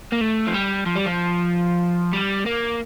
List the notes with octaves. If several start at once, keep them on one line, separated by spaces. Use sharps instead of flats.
A#3
A3
F3
G3
F3
G3
F3
G3
A#3